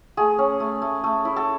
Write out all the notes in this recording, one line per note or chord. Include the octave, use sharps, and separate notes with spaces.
A3 G#4
C#4
A3
A3
A3
E4
A4